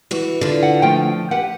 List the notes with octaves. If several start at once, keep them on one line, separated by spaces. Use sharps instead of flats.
E3 F#4
D3 F4
F#5
F3 A3 G5
G4 B4 F#5